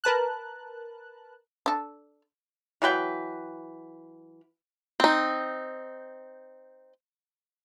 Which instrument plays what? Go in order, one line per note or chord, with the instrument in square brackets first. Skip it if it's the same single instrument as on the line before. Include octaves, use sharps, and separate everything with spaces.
[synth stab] A#4 B4 A5 F#6
[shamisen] D4 A4
[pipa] E3 F#3 B4 G5
[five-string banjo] C4 D#4